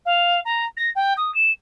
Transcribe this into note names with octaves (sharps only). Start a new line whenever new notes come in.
F5
A#5
A#6
G5
D#6
E7